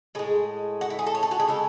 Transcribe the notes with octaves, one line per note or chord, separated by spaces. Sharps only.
A2 G#3 G#4
F#4
E4
G#4
A4
C#5
A4
F#4
G#4
C#3 G#3 A4